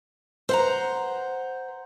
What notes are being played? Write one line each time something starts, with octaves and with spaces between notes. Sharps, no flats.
C5 F#5 A#5